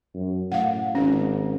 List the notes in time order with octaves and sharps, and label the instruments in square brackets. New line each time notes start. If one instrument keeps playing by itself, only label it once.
[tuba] F#2
[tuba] A2 [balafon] F5 F#5
[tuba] G#1 [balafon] C#4